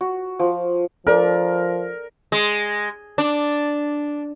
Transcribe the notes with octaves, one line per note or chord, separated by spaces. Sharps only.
F#4
F3
F3 A4 A#4 D5
G#3
D4